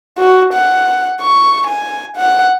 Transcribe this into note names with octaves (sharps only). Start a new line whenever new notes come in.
F#4
F#5
C#6
G#5
F#5